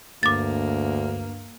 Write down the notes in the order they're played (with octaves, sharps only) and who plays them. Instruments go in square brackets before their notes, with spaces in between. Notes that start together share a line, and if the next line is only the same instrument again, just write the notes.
[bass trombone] D2 [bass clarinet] G2 [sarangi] A#3 [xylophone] D6 A6